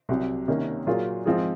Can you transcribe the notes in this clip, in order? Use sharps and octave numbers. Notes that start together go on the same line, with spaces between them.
C2 C3 F#3
C2 C3 D#3 A#3 C#4
A#2 F#3 A#3 F4 G#4
G#2 F3 C4 F4 G#4